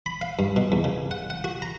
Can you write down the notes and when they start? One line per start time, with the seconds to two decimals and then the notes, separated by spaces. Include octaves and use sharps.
0.06 B5
0.21 F5
0.39 G2
0.56 B2
0.72 E2
0.84 C#3
1.11 F#5
1.30 F#5
1.44 F#4
1.62 A#5